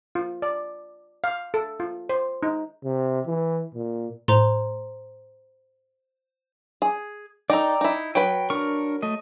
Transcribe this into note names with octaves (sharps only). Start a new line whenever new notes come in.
F4
D5
F5
A4
F4
C5
D#4
C3
E3
A#2
A2 C5 A#5 C6
G#4
D#4 A4 D5 G5 A#5
D#4 E4
F#3 B4 G5
D4 A#4 C#6
A3 D#5